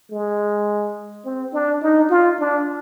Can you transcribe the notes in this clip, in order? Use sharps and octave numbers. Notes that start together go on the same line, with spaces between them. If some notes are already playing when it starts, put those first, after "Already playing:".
G#3
C4
D4
D#4
F4
D4